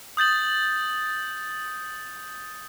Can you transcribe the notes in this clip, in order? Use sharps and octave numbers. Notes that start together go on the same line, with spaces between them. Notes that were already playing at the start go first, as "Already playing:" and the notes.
D#6 G6 A6 F#7